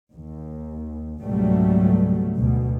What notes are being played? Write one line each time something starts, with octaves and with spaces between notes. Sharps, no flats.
D#2
C#2 G#2 B2 F#3 G3 A3
D2 B2